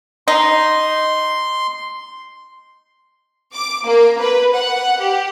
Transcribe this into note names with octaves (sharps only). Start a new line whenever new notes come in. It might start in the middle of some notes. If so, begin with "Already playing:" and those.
D#4 C6
D6
A#3
B4
F#5
G4